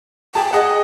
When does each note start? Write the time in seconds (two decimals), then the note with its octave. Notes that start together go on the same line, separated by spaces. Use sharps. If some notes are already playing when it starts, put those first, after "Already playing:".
0.35 G#4 G5 A5
0.53 G#4 D#5 F#5